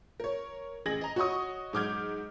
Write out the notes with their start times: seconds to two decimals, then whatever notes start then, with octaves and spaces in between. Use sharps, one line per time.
0.20 A#4 C#5
0.86 A1 G#4 G#6 A#6 F#7
1.01 D#5 A#5
1.16 F#4 C#5 D#5 C#6 D#6
1.73 G#2 F#3 D6 F6 G6 G#6